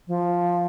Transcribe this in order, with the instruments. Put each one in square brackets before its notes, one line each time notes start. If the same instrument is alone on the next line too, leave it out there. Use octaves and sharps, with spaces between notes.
[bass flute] F3